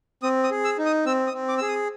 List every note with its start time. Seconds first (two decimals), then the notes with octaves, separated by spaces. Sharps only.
0.23 C4 D#6
0.44 D#6
0.51 G#4
0.64 E6
0.78 D#4
0.86 D#6
1.06 C4 E6
1.27 D#6
1.33 C4
1.48 D6
1.58 G#4 E6
1.68 D#6